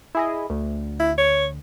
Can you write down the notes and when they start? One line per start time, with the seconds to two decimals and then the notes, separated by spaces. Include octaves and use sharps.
0.15 E4 G#4 D#5
0.50 D2
1.00 E4
1.18 C#5